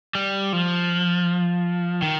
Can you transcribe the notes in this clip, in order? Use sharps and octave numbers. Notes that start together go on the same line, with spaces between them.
G3
F3
D#3